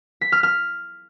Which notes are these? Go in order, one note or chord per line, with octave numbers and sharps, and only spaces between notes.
B6
F6
F6